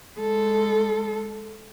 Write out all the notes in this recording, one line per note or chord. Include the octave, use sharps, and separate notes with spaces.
G#3 A4